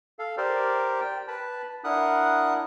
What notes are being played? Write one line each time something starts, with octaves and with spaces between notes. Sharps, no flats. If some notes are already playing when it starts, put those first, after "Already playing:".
A4 F5
G4 A#4 C5 D5
G5
B4 A5 B5
D4 E4 A#4 F#5 D#6 F#6